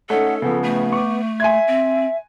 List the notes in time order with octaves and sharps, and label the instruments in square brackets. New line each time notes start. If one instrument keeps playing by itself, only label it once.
[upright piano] A3 C#4 D#4 [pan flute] A4 [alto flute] F#5
[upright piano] C#3 F3 [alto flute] B3
[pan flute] A3
[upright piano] C#6 D6
[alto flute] E5 [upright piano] G#5 C6 G#6
[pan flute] C4